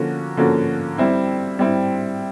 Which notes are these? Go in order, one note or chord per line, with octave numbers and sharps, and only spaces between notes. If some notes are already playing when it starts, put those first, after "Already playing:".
Already playing: D3 F3 A#3 C#4 F#4
D3 F3 A#3 C#4 F#4
G3 C4 E4
G3 C4 E4